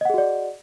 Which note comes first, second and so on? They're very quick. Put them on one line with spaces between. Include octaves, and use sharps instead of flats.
D#5 F#5 G#4 F#4 D5